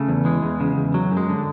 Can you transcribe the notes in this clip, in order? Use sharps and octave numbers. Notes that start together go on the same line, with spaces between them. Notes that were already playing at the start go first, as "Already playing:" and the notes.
Already playing: C#3 A3
E2
E3 G#3
E2
C#3
E2
F#3
F#2
G#3
D3